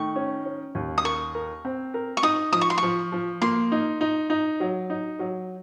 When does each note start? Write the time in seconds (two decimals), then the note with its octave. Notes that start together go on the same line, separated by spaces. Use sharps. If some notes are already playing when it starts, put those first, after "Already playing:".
Already playing: D#3 A3 C#6
0.16 C#4
0.45 C#4
0.75 D#2
0.98 D#6
1.04 A#4 C#6
1.35 A#4
1.65 C4
1.94 A#4
2.17 C#6
2.23 D#4 D#6
2.52 F3 D#6
2.61 C#6
2.70 C6
2.78 F3 C#6
3.12 F3
3.42 A#3 C6
3.72 D#4
4.01 D#4
4.30 D#4
4.60 F#3
4.90 D#4
5.19 F#3